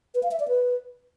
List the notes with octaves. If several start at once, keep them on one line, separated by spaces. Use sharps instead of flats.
B4
F5
E5
D5
B4